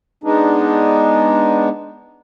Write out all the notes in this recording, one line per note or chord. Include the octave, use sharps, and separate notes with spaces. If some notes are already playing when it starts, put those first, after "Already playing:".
G#3 B3 D4 D#4